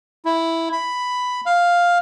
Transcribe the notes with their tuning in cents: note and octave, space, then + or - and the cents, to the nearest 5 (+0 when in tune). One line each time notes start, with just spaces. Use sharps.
E4 +0
B5 +5
F5 +5